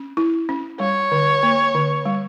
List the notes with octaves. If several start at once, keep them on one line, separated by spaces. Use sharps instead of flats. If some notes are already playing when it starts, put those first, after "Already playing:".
Already playing: C#4
E4
C#4
G3 C#5
D3
A#3
D3
G3